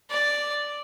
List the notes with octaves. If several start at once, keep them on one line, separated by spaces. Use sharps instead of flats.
D5